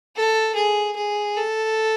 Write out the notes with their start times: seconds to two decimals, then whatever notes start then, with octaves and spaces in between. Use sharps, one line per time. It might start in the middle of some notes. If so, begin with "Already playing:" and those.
0.16 A4
0.55 G#4
0.96 G#4
1.37 A4